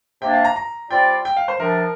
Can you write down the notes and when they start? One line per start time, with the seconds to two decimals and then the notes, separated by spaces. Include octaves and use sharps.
0.22 C3 A#3 D4 G5
0.33 F5
0.44 A#5
0.56 A#5
0.90 G3 C4 F4 D5 G5
1.25 G5
1.37 F5
1.48 C5
1.59 C3 F3 D4 A#4